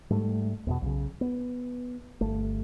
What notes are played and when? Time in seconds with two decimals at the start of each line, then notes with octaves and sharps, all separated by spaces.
0.10 G#2 G3 A3
0.67 E2 G#2 B2
0.82 B1 C#3
1.21 B3
2.21 G1 A3